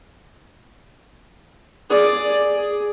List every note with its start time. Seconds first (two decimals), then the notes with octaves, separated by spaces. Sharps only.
1.90 G#4 D5
2.56 G#4